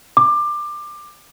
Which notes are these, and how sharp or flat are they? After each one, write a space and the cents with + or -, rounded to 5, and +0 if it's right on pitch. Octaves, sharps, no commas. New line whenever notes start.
D6 +20